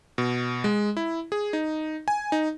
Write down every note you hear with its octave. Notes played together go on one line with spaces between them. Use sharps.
B2
G#3
E4
G#4
D#4
G#5
D#4